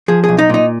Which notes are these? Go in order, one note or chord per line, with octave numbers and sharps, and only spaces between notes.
F3 G#4
B1 G#4
D#4
A#2 D#4